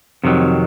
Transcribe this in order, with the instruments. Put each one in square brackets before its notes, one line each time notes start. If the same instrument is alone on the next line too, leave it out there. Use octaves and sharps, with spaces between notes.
[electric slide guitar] F2 C3 D#3 F#3